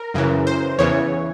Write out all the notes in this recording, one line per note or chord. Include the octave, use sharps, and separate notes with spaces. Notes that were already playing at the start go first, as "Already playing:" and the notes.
Already playing: A#4
F#2 C#3 E3
C5
E2 C#3 E3 C#5